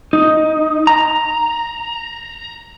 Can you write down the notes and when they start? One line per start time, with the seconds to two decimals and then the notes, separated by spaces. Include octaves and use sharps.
0.13 D#4
0.87 A#5